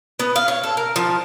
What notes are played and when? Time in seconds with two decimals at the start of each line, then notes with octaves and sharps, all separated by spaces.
0.20 B3
0.36 F5
0.48 C#5
0.63 A4
0.77 A#4
0.96 F3